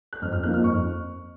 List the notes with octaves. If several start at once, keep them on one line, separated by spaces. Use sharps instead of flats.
F#6
F2 F6
F6
F3 A#3 D#4 F#6
F6
F2 C#6